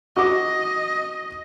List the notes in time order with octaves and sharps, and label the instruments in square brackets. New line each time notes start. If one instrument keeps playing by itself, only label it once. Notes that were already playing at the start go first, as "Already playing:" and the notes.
[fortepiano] F#4 D6 [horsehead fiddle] D#5